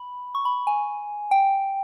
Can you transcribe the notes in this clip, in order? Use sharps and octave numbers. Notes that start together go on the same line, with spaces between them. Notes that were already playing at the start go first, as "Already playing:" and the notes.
Already playing: B5
C#6
B5
G#5
G5